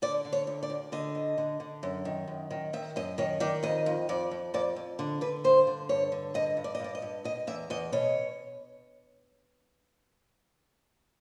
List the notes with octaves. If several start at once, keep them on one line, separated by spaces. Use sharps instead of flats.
D3 D5
D3
C#5
D2
D5
D2
D3 D#5
D2
D3
D3
F#2
D#3
F#2
D#3
D#3 E5
F#2 D#5
D#3 C#5
D#3 D5
F2 D#5
F2
F2 D5
F2
F2 D5
F2
D3
D3 B4
G2 C5
D3
G2 C#5
D3
G2 D#5
G2
D5
D#5
G2 D5
D#5
G2
B2 D#5
E2 E5
E2 D#5
B2 C#5